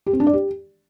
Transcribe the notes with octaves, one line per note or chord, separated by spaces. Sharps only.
G4
C4
D4
D5
G4